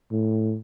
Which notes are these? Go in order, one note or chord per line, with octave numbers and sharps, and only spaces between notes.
A2